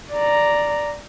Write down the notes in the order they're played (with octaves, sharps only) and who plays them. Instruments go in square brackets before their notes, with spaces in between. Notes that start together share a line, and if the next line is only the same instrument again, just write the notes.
[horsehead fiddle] D5 A#5